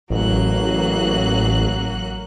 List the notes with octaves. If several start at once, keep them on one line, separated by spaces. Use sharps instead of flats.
A1 F#3 A#3 F#6